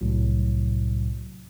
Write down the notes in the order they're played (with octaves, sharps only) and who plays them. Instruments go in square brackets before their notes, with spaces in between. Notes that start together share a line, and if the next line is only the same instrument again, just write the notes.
[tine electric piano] C2 A2 C3 F#3